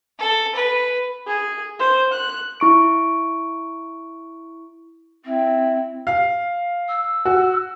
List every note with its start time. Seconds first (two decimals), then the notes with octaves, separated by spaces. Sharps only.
0.19 A4
0.55 B4
1.27 G#4
1.79 C5
2.12 F#6
2.60 E4 C#6 D7
5.25 C4 E4
6.07 F5
6.89 E6
7.25 F#4